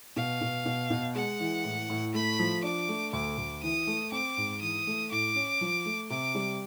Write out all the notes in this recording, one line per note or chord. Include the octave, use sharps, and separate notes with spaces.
B2 F5
B2
B2
B2
G#3 F#5
E3
A2
A2
A3 B5
F3
D4 D6
A3
D2 D6
D2
E3 D#6
A3
C4 D6
G#2
E3 D#6
A3
A2 D6
C#4
F3
A3
C3 D6
G3